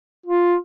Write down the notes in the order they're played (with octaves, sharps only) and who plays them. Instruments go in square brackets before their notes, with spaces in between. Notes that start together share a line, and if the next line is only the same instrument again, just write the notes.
[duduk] F4